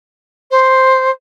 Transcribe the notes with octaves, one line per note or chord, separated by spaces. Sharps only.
C5